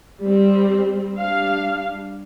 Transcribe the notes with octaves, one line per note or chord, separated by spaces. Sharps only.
G3 C4
G3 D4 F5